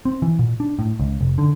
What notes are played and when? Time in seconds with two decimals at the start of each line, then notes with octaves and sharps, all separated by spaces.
0.05 C4
0.22 E3
0.39 A#2
0.60 D4
0.79 A2
1.00 C#2
1.21 F1
1.38 D3